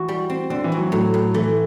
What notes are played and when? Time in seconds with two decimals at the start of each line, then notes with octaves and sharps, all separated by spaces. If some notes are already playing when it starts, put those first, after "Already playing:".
Already playing: E3 F#4
0.08 G3
0.30 C4
0.50 D3 C4
0.64 E3
0.72 F#4
0.78 F#3
0.92 A2 F#3
1.14 A2
1.34 E3 A3